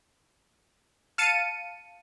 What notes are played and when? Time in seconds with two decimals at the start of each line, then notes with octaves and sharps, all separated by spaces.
1.18 F5 A5 C#7 D#7